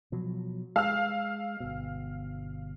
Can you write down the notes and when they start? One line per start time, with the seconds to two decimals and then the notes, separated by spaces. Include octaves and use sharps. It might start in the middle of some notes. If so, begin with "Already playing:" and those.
0.12 B2 F3 F#3
0.76 G#3 F5 E6 F6
1.60 G1 B2